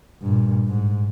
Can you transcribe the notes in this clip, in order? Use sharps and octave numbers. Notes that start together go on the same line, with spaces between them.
G2 A#2
G#2